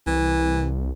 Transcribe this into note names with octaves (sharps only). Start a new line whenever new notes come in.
C2 E3